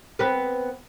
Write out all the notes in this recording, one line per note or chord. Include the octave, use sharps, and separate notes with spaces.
B3 C4 B4